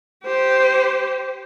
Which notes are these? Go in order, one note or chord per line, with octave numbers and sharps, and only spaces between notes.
G4 C5